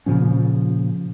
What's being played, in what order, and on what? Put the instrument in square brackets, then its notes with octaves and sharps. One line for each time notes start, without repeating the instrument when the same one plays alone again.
[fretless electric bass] A#2 C#3 F3 C#4